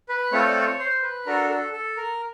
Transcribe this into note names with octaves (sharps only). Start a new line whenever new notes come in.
B4
A3 C4 F4 A4 C#5
D5
C#5
C5
B4
D4 F#4 A4 A#4
A#4
A4
A4
A#4